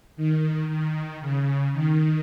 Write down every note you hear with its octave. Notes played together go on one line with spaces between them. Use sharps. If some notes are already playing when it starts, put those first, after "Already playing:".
D#3
D#3
C#3
D#3